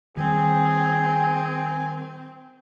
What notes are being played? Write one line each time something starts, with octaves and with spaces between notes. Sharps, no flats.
D#3 G3 C4 G#4 G#5